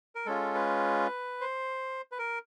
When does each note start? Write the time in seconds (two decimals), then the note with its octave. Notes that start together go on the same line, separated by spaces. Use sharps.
0.15 A#4
0.26 G#3 C#4 F4 A4
0.54 B4
1.41 C5
2.12 B4
2.18 A#4